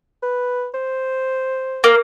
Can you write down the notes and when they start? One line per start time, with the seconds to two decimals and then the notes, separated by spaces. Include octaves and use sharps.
0.22 B4
0.74 C5
1.84 A#3